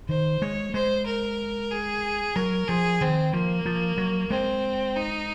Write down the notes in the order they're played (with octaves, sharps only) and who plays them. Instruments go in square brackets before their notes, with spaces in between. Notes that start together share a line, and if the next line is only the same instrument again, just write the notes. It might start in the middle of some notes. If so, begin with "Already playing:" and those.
[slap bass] D#3 [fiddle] C5
[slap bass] G#3 [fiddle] C#5
[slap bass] G#3 [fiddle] C5
[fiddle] A#4
G#4
[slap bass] F#3 [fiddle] A#4
[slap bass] F3 [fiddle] G#4
[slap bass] D#3 [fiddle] C4
[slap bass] F3 [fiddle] A#3
[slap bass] F3
F#3
[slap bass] G#3 [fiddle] C4
[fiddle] D#4